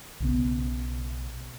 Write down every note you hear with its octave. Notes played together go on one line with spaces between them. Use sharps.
B1 C#3 B3